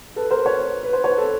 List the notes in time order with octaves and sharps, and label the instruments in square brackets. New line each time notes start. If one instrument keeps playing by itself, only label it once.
[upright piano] A4 B4
A#4 C5
B4 C#5
B4
C5
B4 C#5
A4 B4